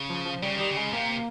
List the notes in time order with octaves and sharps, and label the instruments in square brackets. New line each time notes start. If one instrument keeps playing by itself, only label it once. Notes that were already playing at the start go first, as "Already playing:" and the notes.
Already playing: [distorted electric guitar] C#3
[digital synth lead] F3
F3
[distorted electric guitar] C#3 [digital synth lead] G3
[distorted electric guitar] D#3 [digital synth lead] G3
[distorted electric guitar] C#3
[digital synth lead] G#3
[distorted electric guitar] C3 [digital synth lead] A#3